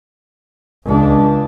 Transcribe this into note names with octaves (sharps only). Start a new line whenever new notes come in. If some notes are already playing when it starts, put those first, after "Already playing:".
C#2 D4